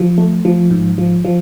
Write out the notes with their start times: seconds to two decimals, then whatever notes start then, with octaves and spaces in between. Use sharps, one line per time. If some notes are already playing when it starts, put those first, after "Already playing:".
Already playing: F3
0.18 A3
0.45 F3
0.71 G#2
0.98 F3
1.25 F3